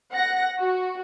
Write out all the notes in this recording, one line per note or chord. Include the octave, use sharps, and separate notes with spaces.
F#5 A#6
F#4